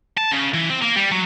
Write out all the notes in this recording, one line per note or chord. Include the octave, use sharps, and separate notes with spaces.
A5
C#3
E3
C4
A#3
G3
F#3